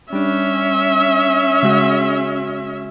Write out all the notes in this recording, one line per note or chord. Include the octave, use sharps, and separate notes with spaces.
G3 C#4 D4 E5
C#3 G#3 F#4